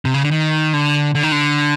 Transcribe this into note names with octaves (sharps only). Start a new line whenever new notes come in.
C3
C#3
D3
D#3
D3
D3
D#3
D3